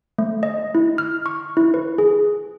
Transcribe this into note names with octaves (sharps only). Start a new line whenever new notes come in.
A3
D#5
E4
F6
C#6
E4
B4
G#4